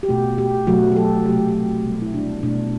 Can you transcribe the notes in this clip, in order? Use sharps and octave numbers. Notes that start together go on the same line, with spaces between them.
G4
B2 A3 F#4
G4
B2 F#3 A3 F#4
G4
A4
C3 F#3 A3 G4
F#4
G4
B2 G3 B3
E4
D4
B2 A3 D4